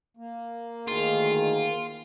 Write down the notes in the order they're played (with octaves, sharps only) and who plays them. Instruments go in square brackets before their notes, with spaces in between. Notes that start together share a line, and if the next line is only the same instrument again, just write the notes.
[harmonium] A#3
[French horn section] D2 D#3 G#4 [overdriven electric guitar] F4